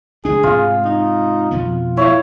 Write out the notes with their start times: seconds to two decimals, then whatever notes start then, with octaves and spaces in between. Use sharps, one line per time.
0.25 C#2 D4 G#4
0.43 G#2 C3 F4
0.85 D#4
1.51 F2 B2 B3
1.97 E4 C#5 F5